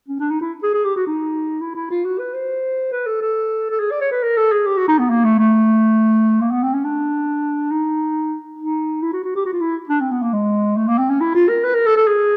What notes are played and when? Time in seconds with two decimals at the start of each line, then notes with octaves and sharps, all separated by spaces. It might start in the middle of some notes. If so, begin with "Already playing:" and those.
0.08 C#4
0.19 D4
0.31 D#4
0.41 E4
0.63 G#4
0.74 G#4
0.85 G4
0.96 F#4
1.07 D#4
1.61 E4
1.75 E4
1.90 F4
2.05 F#4
2.19 B4
2.34 C5
2.92 B4
3.06 A4
3.21 A4
3.70 A4
3.79 G#4
3.91 D5
4.01 C#5
4.11 B4
4.23 A#4
4.37 A4
4.52 G#4
4.66 G4
4.78 F#4
4.88 D#4
4.99 B3
5.10 A#3
5.25 A3
5.39 A3
6.41 A#3
6.51 B3
6.63 C4
6.74 C#4
6.84 D4
7.71 D#4
8.59 D#4
9.03 E4
9.13 F#4
9.24 F#4
9.36 G4
9.46 F#4
9.53 F4
9.60 E4
9.89 D4
10.00 C4
10.11 B3
10.22 A#3
10.33 G#3
10.77 A3
10.88 A#3
10.98 C4
11.09 C#4
11.21 E4
11.35 F4
11.49 A#4
11.64 B4
11.75 A#4
11.86 A4
11.97 A4
12.07 G#4